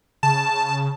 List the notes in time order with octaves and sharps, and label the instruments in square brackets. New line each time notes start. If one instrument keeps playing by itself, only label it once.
[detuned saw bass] C#3 [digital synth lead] A5